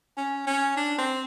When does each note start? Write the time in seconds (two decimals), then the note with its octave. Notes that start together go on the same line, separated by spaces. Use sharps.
0.17 C#4
0.47 C#4
0.76 D4
0.98 C4